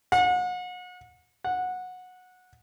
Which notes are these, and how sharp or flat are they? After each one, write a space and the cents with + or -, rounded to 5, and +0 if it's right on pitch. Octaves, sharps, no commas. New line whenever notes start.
F#5 -35
F#5 -15